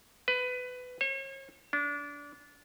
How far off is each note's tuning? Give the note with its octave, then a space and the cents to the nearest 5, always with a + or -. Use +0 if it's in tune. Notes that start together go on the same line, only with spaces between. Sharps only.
B4 +20
C#5 -40
D4 -25